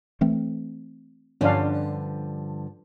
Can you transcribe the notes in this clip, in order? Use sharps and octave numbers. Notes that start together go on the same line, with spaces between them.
E3 A3 C4
G2 D3 F3 C#4 D4 F5